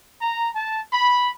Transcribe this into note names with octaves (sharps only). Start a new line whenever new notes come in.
A#5
A5
B5